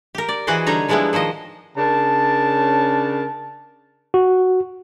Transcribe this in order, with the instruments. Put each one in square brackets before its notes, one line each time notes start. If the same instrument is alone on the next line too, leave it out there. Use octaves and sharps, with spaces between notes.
[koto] G4 A#4
D5
E3 F#4 G#4 B4 C5 D#5
D3 G3 D#4 C#5 A#5
F3 G3 G#3 B3 D4 E4
D#3 F3 C5 D#5
[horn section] C#3 C#4 D4 A#4 A5
[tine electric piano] F#4